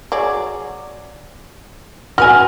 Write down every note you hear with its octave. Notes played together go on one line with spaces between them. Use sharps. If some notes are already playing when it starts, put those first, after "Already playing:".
F#3 G#4 D5
F#4 B4 G#5 F6